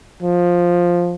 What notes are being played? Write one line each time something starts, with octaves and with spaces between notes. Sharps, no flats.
F3